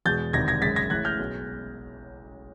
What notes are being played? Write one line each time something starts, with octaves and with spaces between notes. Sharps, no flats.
E2 B2 G#3 G6 A6
E1 D2 C3 D#3 G#6 A#6
G#6 A#6
F#1 F#2 D#3 G#3 A6 B6
G#6 A#6
A1 A2 E3 G#3 F#6 G#6
F6 G6
B1 B2 G#3